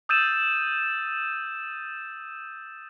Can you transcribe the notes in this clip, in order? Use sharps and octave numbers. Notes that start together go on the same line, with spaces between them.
D#6 E6 G6 A6 D#7 E7